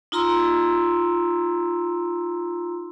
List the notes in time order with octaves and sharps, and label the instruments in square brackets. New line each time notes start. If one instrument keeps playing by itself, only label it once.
[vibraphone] D#4 F4 A#5 C6 E6